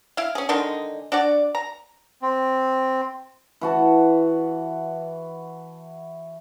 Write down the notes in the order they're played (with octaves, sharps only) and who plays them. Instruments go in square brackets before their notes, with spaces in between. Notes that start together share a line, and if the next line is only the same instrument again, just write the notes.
[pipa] E4 F5
C#4 G#4
D3 D#3 G#3 D#4
D4 F#4 D5
A#5
[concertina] C4
[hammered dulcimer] E3 F#4 A5